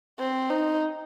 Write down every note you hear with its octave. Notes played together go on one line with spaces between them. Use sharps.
C4
D#4